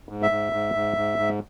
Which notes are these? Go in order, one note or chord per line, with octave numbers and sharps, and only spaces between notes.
G#2
E5
G#2
G#2
G#2
G#2
G#2